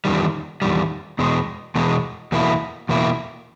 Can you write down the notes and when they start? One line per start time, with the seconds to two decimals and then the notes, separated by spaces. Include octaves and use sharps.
0.05 E2 D#3 G3
0.62 E2 D#3 G3
1.19 E2 B2 G#3
1.75 E2 B2 G#3
2.32 E2 B2 A#3 E4
2.89 E2 B2 A#3 E4